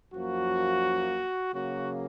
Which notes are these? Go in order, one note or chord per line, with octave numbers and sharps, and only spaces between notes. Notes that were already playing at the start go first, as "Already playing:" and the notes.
F#2 F3 A#3 F#4
C#3 F#3 A#3 F#4